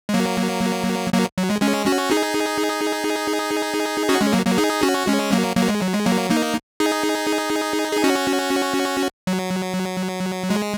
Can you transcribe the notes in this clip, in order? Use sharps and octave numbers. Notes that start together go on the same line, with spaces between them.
G#3
F#3 A#3
F#3 A#3
F#3
G#3
G#3 C#4
C#4 F#4
D#4 G#4
C#4 F#4
G#3 C#4
F#3 A#3
F#3 A#3
D#4 G#4
C#4 F#4
G#3 C#4
F#3 A#3
F#3 A#3
G#3
F#3
G#3
F#3 A#3
A#3 D#4
D#4 G#4
G#4
C#4 F#4
F#3
G#3